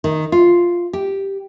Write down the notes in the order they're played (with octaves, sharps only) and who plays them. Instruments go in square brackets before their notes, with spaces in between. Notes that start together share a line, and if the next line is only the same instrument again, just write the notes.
[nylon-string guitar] D#3
F4
G4